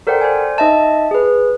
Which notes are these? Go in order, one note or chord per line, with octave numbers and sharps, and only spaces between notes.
A4 A#4 C5 D5 F#5 G5
C5 D5 G#5
D#4 D#5 E5 A5
G#4 B4